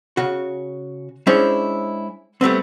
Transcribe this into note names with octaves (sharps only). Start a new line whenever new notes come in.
C#3 F#4
G#3 C#4 D4 E4 C5 C#5
G3 A3 B3 C4